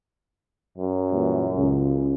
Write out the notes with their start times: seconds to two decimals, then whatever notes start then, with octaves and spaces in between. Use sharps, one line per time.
0.78 F#2
1.11 A#2 E3 G3
1.56 C#2 C#3